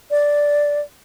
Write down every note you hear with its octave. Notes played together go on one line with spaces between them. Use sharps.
D5